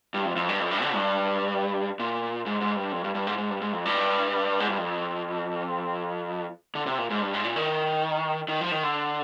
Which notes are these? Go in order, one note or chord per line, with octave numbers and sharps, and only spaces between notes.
G2
F2
F2
G2
F2
G2
D3
G2
A#2
G#2
G#2
G2
F2
G2
G2
G#2
G#2
G2
G#2
F2
G2
G#2
G2
F2
D3
C3
A#2
G#2
G2
G#2
A#2
D#3
D#3
F3
D#3
D3